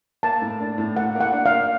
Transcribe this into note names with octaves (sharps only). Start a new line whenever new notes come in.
A#3 A5
A2
D4
A2
A#3 F#5
A#3
F#5
D4
F5
A#3